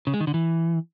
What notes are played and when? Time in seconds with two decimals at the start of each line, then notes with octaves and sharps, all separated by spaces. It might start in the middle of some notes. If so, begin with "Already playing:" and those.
0.07 C#3
0.14 G#3
0.20 D#3
0.27 D3
0.34 E3